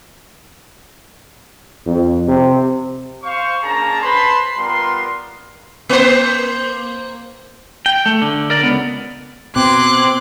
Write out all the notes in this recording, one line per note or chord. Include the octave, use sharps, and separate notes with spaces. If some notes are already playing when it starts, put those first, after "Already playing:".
F2
C3
C5 F5 C#6
A#3 C#4 D4 G#4 A5 A#5
B4 C5 A5 B5 C6
G3 B3 F4 A#4 C6
A#3 C5
G5
A3
D3
A#4 D5
C#2 B3
B2 C4 C6 D6 F#6 G#6